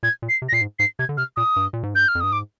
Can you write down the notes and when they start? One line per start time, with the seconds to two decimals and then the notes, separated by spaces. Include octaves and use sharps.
0.03 A#2 G#6
0.22 A#2
0.29 C7
0.42 C3
0.49 A#6
0.52 A#2 C7
0.61 G#2
0.79 G#2 C7
0.99 C3 G#6
1.09 D3
1.17 C3 F6
1.36 A#2 D#6
1.56 G2
1.73 A#2
1.83 G#2
1.94 G2 G6
2.08 F6
2.15 F2
2.20 G2 D#6
2.32 G#2 D6